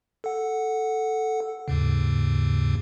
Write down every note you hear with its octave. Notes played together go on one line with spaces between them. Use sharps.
A4 F#5
D#2 G#2 C#3